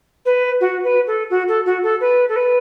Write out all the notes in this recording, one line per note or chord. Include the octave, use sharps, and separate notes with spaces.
B4
F#4
B4
A4
F#4
A4
F#4
A4
B4
A4
B4